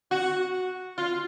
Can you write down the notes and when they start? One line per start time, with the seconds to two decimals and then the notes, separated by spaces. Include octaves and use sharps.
0.11 F#4
0.98 F4